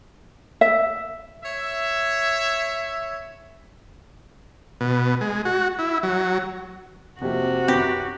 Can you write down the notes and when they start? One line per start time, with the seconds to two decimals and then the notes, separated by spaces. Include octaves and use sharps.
0.61 E5
1.44 C#5 E5
4.81 B2
5.21 G#3
5.45 F#4
5.79 E4
6.03 F#3
7.22 F2 C3 A#3 F#4
7.68 F#2 G4 B4 A#6